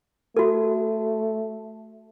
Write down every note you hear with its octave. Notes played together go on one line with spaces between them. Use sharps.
A3 F#4 A4